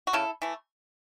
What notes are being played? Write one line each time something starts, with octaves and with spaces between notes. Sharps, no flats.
F#4
C#3 E4 A4
E3 A3